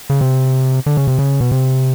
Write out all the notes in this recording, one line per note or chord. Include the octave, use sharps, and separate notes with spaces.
C#3
C3
D3
C#3
C3
C#3
B2
C3